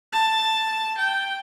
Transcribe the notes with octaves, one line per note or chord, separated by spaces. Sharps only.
A5
G5